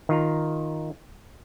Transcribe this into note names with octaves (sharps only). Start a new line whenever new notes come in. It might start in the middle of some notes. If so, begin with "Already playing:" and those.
D#3 F4 A#5